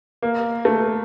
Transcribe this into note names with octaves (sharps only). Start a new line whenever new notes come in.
A#3
A3